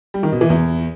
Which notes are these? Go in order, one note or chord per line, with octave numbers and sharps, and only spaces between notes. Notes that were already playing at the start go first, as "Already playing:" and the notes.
G3
D#3
B2
E3
E2